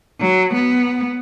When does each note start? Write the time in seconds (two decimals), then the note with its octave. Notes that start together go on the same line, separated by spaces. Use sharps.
0.20 F#3
0.53 B3